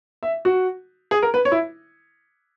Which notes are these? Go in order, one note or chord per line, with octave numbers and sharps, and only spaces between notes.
E5
F#4
G#4
A#4
B4
C#5
E4